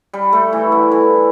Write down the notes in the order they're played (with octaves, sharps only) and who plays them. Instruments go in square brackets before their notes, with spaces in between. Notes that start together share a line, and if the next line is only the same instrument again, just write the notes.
[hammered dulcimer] G3
A3
E3
D3
E3